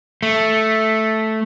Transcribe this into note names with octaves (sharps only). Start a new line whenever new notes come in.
A3